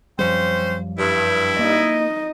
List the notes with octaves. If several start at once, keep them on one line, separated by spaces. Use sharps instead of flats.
F#2 F3 G3 C4 C#4 C5
G2 E4
A#3 D#4 D#5